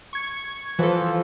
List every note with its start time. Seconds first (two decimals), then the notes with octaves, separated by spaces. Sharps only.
0.13 C#6 G#6 C#7
0.79 E3 F3 A4